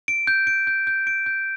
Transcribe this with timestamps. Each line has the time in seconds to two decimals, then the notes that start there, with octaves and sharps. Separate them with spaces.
0.08 D7
0.27 G6
0.47 D7
0.67 G6
0.87 G6
1.07 D7
1.26 G6